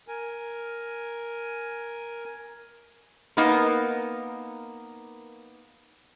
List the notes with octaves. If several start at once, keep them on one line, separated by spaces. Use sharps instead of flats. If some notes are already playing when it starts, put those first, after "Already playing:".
A#4 G#5
A#3 B3 D#4 A#4